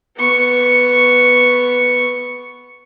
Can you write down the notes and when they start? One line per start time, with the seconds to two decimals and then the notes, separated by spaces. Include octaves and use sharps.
0.17 B3 C#6